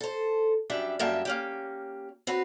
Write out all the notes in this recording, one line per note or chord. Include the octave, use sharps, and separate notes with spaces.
A4 C5
F#2 G3 D4 E5 G5
F#2 G3 A#3 E5 G5 A5
A#3 C#4 G4
C4 F#4 B4 C#5